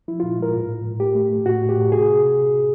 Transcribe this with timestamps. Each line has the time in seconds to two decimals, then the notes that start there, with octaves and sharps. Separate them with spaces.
0.08 F3 E4
0.20 A#2 F4
0.39 G#3 A#4
0.54 A2
0.69 A2
0.85 A2
1.00 A3 G4
1.15 A3
1.30 A3
1.46 A2 F#4
1.61 A2
1.69 G4
1.76 A2
1.91 C3 G#4